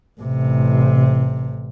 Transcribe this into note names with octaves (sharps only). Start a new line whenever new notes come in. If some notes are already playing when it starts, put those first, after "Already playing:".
A1 C3